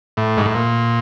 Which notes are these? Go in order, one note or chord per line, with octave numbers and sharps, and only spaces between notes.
A2
G#2
A2
A#2